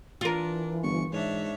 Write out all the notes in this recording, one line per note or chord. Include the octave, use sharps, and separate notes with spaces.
E3 D4 F4 A#4
G1 C#6
G#2 D4 C#5 E5